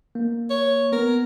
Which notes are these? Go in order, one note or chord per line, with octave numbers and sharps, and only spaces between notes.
A#3
C#5
B3 A#4